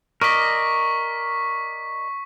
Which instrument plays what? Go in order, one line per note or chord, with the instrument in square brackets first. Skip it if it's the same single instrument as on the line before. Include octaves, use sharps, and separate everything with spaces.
[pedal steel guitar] A#4 D5 D#5 [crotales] C#6 B6